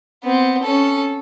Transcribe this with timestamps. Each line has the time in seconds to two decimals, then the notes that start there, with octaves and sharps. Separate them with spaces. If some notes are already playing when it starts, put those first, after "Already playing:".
0.24 B3 C4
0.63 C#4 A4